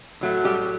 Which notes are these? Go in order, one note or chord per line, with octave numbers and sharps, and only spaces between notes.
A2 F#3 A3
G3 G4